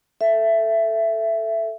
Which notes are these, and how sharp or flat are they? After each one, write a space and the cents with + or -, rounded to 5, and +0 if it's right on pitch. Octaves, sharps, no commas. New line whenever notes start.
A4 +0 E5 +15